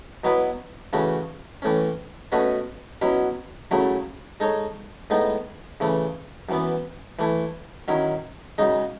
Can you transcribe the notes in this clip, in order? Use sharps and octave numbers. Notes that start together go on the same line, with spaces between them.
B2 F#3 B3 E4 B4
C#3 E3 A3 C#4 F#4
A2 E3 A3 C#4
B2 A3 C#4 F#4 B4
B2 F#3 C#4 E4
F#2 C#3 F#3 A3 E4
G#3 D#4 A4 C#5
A2 G#3 B3 D#4
C#3 E3 A3
F#2 E3 B3
E3 A3 E4
D#3 F#3 C#4 E4
F#2 C#3 G#3 D#4